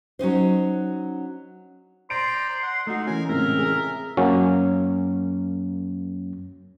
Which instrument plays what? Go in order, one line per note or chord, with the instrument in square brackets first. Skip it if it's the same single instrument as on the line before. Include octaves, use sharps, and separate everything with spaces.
[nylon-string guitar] F#3 C#4 D#4 C5
[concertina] C5 D5 A#5 [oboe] C6 [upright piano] D7
[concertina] F#5
[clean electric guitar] A3 F#4 [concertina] D#4
[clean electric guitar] E3 C#4 [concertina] A#4 G#5
[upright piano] C#2 A2 C3 [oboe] A#4 [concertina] E5
[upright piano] G#4
[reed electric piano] F#2 F#3 A#3 C#4